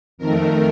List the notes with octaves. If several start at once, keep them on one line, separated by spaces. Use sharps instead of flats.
F2 D#3 A3 A#4